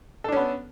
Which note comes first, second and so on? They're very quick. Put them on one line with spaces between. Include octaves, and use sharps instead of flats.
A4 D4 C#4 B3